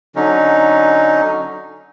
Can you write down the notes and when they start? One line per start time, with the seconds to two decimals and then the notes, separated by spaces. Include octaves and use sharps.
0.16 D3 F#3 C#4 D#4